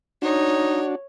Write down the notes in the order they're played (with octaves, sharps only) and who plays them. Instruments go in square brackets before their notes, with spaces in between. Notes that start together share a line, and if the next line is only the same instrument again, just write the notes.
[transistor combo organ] D4 F#4 [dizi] D#4 [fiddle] C#5